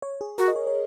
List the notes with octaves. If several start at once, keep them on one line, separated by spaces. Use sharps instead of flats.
C#5
G#4
F#4 A#4
D#5
C#5
C#5